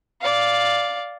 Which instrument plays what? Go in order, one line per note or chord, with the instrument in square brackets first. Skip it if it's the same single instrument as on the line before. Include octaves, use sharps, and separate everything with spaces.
[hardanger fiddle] D5 F5